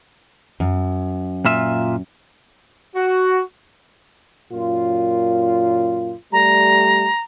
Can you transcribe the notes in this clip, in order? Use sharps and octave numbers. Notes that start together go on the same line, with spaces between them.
F#2
A#2 F4 E5
F#4
F#2 A#2 F4
G3 A3 A#5